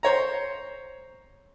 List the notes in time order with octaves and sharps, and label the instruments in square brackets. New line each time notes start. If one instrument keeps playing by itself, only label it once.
[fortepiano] C5 C#5 A#5